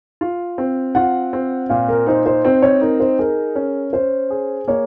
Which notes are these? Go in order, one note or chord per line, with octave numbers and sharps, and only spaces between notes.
F4
C4
F4 F#5
C4
A#2 F5
A#4
D#4 C5
C5
C4 C5
C#5
D#4 A#4
C5
G#4 A#4
C#4
C#4 C5
G#4
A#3 C#5